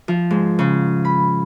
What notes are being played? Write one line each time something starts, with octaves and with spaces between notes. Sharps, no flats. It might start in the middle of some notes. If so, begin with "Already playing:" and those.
F3
G#2
C#3
B5